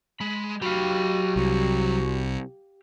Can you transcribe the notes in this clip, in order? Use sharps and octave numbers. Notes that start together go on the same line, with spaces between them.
G#3 B5
F#3 F#4 G4 F5 B5
C2 F#4